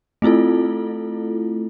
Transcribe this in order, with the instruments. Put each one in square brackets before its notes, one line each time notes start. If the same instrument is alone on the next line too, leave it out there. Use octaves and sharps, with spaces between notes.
[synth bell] A3 C4 E4 F4 A4